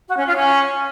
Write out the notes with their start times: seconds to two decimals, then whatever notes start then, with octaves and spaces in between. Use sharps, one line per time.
0.08 F#4
0.17 C#4
0.26 F4
0.36 C#4